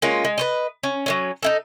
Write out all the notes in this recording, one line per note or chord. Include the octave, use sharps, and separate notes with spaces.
G#3 A#3 C#4 F4
G#3
B4 C5 D#5
C#4
F#3 B3 C#4
D#4 E4 A4